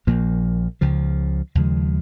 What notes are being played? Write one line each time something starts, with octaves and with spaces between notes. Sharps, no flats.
A#1 A#2 F3 A#3
C#2 C#3 F3
D#2 C#3 F3 G#3